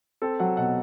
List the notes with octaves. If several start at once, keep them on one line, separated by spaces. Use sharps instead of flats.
C4 A4
F#3 F#5
B2 F#5